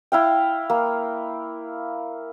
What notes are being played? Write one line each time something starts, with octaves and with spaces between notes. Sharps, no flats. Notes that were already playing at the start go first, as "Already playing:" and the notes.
E4 F5 G5
A#3